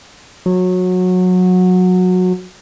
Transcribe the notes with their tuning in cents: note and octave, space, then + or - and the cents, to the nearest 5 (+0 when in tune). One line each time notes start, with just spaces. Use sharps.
F#3 -20